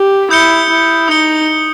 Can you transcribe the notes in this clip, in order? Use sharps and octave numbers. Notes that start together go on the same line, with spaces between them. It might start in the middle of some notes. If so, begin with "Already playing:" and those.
Already playing: G4
E4 D#6 G6 C#7 G7
E4
D#4 D#6 G6 C#7 G7